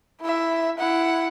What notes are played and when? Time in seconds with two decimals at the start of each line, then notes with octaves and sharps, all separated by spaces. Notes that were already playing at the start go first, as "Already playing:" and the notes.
0.22 E4 E5
0.78 E4 F#5